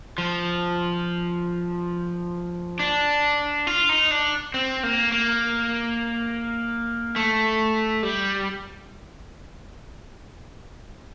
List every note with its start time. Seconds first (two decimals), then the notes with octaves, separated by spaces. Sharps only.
0.18 F3
2.79 D4
3.67 F4
3.89 D#4
4.11 D4
4.54 C4
4.83 A#3
5.12 A#3
7.16 A3
8.03 G3